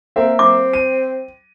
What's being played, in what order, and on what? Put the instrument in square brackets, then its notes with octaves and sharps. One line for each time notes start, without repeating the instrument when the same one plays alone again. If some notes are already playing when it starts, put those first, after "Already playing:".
[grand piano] A#3 E5 [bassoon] C4
[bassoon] C4 [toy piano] D6
[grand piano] D#7